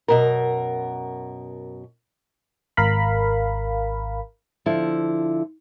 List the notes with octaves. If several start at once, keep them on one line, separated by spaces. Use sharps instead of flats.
F#2 B2 A#4
G#1 A#4 F5 B5
D3 F3 E4